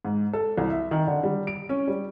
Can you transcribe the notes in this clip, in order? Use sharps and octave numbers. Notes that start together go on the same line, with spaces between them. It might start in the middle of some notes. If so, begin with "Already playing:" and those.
G#2
A4
C2
E5
D#3
D3
G3
D7
C#4
G3